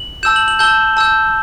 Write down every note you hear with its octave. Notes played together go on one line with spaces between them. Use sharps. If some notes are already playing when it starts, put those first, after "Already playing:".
Already playing: F#7
A5 E6 G6 E7
F#7
F#7
A5 E6 G6 G7
A5 E6 G6